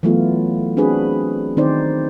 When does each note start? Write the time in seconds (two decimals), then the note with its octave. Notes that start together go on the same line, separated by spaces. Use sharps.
0.03 E3 F#3 A3 B3 F4
0.77 C4 D4 F#4 G#4 B4
1.57 D#3 C4 D#4 C5 D5